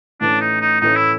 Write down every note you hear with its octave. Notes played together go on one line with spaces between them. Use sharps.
A2 E3 A3 C#4 D4
D#4
D#4
A2 E3 A3 C#4 D#4
E4